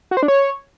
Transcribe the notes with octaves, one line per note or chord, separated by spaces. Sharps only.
F#4
C5
D4
C#5